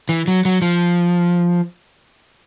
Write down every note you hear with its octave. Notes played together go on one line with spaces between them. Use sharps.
E3
F#3
F#3
F3